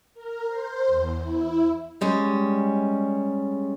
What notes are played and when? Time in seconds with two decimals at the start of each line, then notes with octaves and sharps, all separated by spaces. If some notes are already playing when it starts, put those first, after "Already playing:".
0.14 A#4
0.47 C5
0.87 E2
1.22 E4
2.01 G3 G#3 C#4